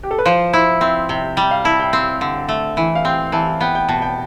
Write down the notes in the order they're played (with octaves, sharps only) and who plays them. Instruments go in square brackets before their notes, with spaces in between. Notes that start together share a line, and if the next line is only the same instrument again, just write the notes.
[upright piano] G4
A4
B4
[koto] F3 [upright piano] C5
[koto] E4 [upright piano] C5
[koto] C4 [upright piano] E5
[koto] C3 [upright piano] G5
[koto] G3 [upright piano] G5
[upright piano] F5
[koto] E4 [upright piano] A5
[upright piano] G5
[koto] C4
D3
A3
E3
[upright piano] F5
[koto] C4 [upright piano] G5
[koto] E3 [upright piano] A5
[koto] B3 [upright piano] G5
[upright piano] G5
[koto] B2 [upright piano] A5
[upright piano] G5